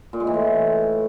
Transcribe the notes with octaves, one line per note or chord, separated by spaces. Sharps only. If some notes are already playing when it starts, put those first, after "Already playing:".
A#2
G#3
E3
A2